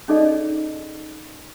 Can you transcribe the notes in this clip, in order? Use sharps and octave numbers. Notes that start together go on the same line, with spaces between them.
C#4 D#4 G#4 A4 D5 D#5